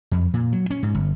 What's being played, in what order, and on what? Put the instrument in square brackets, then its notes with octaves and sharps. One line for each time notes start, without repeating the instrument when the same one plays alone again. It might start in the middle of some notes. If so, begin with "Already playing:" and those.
[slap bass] F2
A#2
F#3
C#4
G#2
G1